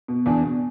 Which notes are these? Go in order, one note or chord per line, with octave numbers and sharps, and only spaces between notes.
B2
E2 D4
B2